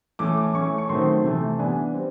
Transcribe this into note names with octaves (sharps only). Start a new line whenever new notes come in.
E3 A3 C#4 D6
D6
E3 A3 C#4 C#6
C#6
D#3 F#3 A3 C4 C6
C3 E3 A3
E3 G3 B3 D4 G#5
G3 C4